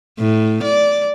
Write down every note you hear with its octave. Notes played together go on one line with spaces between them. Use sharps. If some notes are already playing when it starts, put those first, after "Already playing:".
A2
D5